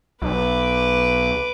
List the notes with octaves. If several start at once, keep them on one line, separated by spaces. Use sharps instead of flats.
B1 B4 D6